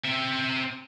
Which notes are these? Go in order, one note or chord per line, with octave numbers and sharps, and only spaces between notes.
C4 E5